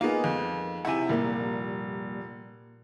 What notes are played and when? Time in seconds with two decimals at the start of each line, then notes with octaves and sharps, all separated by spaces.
0.01 A#3 B3 D#4 F4 G#4 A#4 B4 F5
0.24 F2
0.85 C3 E4 F#5 G#5
1.09 F1 A#2 G3 A#3 A#4